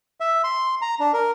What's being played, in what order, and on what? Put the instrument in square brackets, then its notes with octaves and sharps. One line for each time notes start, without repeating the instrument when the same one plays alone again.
[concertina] E5
C6
A#5
D4
A#4